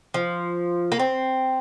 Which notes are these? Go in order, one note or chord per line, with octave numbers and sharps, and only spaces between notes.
F3
A#3
C4